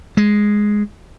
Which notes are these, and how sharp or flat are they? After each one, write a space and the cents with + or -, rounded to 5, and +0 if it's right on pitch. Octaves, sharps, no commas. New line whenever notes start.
G#3 +0